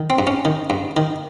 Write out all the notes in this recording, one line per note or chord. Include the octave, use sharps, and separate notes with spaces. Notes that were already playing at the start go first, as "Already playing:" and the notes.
Already playing: D#3
C4
G2
C#4
D#3
G2
D#3